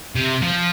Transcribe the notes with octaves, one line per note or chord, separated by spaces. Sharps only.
C3
F3